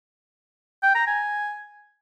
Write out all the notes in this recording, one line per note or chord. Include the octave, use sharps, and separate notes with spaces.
G5
A#5
G#5